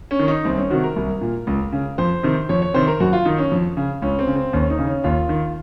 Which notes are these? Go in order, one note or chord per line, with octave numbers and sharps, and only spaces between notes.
C#4
D#3
D#4
C2 C4
C#4
C3 D#3 F#4
A#4
C2
A#2
C#2
C#3
F2 C5
C3 D#3
F2 C#5
C#5
C3 D#3 C5
A#4
F#2 F#4
F4
D#3 D#4
C#4
F2
C#3
C#2 C#4
C4
C#3
C4
D#2 C#4
D#4
C#3
C#4
D#2 F4
D#3